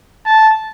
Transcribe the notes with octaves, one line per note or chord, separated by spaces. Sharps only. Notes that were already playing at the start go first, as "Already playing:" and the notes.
A5